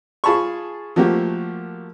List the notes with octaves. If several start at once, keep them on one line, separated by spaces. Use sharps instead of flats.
F4 G#4 A5 B5 C#6
F3 A3 A#3 F#4 G4